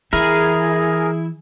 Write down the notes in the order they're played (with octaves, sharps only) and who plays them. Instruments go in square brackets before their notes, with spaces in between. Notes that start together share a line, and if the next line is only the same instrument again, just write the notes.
[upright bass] E3 [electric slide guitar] E4 [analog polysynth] G#4 [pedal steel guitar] A#4